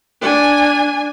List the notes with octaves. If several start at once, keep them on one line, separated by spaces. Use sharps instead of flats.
D4 G#5